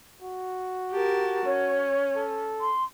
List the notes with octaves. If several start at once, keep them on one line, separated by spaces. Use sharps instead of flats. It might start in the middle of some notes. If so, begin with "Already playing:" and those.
F#4
G4 A#4 A5
C#4 C#5
A4
C6